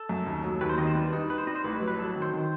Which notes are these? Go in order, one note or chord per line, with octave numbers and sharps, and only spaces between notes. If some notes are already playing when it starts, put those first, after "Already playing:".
Already playing: A4
F#2
D#2
F#3
D#2 B4
C5
D#3 D#5
C5
G3 B4
D#4
D#4 B4
C5
G3 D#5
C5
A1 B4
F#3
B4
F#3 A4
D#3
C5
D#3 C5